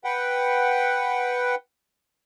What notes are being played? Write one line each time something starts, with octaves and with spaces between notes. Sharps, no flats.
B4 F#5 G5